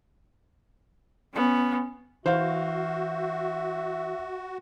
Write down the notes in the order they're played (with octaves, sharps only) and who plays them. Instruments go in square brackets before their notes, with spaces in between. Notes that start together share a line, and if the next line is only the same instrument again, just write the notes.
[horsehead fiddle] B3 C#4
[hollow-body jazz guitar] E3 [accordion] F#4 [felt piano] C5 F5 [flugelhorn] E5